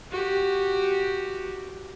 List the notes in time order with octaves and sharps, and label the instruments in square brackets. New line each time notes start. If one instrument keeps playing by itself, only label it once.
[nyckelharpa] F#4 G4